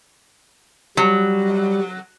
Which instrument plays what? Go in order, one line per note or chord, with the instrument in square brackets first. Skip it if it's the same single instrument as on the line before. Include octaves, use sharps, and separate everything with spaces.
[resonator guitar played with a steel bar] F#3 [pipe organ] G3